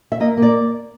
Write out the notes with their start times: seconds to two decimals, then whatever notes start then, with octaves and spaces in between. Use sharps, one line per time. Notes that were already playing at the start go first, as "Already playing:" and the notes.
0.12 E5
0.20 A#3 D#5
0.37 A#3
0.42 D5